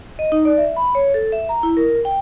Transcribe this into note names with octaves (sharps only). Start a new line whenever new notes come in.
D#5
D#4
D5
E5
B5
C#5
A4
E5
A#5
E4
A#4
G5